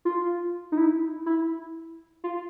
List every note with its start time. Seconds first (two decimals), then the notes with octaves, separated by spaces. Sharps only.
0.05 F4
0.72 D#4
0.78 E4
1.26 E4
2.24 F4